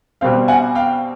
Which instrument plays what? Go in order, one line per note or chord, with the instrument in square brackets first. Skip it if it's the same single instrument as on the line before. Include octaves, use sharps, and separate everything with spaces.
[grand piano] B2 G3 C4 [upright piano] F5 G5
[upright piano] F#5 G#5
F5 G5